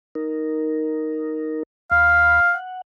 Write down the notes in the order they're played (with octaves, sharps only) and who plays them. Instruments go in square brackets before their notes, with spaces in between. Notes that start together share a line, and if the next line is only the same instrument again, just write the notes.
[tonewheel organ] D#4 A#4
[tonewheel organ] D#2 B5 [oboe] F5
[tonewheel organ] F#5